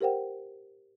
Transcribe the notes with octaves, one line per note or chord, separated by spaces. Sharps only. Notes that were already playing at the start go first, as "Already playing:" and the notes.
G4 A#4 C5 F#5 G5